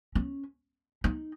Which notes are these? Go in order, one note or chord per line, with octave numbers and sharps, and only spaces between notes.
C#4
D#4